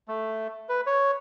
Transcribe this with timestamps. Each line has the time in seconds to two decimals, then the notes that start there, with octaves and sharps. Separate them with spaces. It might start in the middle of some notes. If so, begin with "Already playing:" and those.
0.08 A3
0.69 B4
0.87 C#5